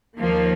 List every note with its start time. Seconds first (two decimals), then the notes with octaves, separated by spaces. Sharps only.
0.18 D#2 D#3 F3 A#3